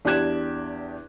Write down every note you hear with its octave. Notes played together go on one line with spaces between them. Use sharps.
E2 D4 G4 F#6 G#6 E7